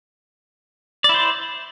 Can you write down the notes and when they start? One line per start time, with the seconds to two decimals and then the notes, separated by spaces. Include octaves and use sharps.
1.04 D5
1.09 E4
1.14 C5